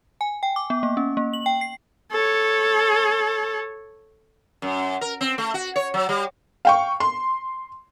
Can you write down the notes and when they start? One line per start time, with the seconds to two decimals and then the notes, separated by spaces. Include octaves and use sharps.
0.21 G#5
0.43 G5
0.56 D6
0.70 B3
0.83 A#3
0.97 C#4
1.17 A#3
1.33 F#7
1.46 G5
1.61 C7
2.11 A4 C#5
4.62 F#2
5.01 A#4
5.21 C4
5.38 A3
5.54 F#4
5.76 C#5
5.94 F#3
6.09 G3
6.65 F5 G5 C#6
7.00 C6